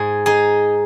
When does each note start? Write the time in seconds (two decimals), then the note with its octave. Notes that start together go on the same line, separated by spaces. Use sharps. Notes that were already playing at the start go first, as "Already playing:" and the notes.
Already playing: G#2 G#4
0.26 D#4 G#4